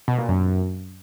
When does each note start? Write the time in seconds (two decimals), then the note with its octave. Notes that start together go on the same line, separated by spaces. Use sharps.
0.08 B2
0.18 A#2
0.28 F#2